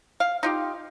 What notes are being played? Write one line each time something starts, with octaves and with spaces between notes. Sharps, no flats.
F5
D#4 F4 G4